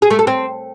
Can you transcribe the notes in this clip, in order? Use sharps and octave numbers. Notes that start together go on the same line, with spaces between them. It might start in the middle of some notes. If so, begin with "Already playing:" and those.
G#4
A3
A4
C4